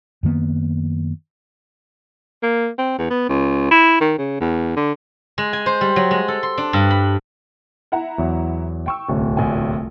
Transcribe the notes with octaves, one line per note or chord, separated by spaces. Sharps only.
F#2 D#3 A#3 B3
A#3
C4
E2
B3
C#2
E4
D#3
C#3
E2
D3
G#3
G#5
C5
G3
F#3
G#3
A4
C6
D4
G2
B5
E4 F#5 A#5
E2 E3 F#3
G5 C#6 E6
D1 C2 C#4
A#1 F4 G#5